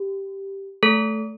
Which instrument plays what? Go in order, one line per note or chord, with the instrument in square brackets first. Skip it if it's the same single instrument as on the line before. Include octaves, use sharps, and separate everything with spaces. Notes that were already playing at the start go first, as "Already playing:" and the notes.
Already playing: [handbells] G4
A3 A4